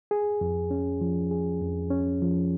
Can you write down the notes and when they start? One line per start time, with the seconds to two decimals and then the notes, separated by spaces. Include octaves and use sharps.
0.11 G#4
0.41 F2
0.71 C#4
1.01 F3
1.31 G#4
1.62 F2
1.90 C#4
2.22 F3